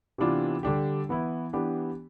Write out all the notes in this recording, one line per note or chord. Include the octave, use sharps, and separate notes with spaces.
C3 E3 B3 D4 F4
D3 G3 D4 G4
E3 B3 E4
E3 B3 D4 G4